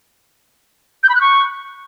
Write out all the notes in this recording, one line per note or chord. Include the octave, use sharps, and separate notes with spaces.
G6
B5
F#6
C#6